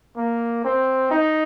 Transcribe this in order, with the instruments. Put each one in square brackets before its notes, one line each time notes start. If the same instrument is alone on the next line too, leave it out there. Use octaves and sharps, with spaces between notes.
[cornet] A#3
C4
D#4